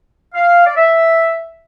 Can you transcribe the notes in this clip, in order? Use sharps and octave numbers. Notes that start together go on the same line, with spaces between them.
F5
D5
E5